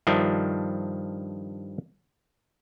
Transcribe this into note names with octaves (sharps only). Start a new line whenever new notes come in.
G2 D#3 F3 D4 E5